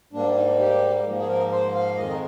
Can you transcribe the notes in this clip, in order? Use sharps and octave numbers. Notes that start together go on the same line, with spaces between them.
G#2 G3 A#3 D4
D#4
G4
G#2 F3 A#3
G#4
A#4
C5
F5
F2 D#3 G#3 D#5
A#4